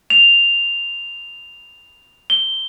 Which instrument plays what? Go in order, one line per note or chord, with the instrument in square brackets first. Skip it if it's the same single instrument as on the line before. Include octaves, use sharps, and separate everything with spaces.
[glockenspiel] F7
G7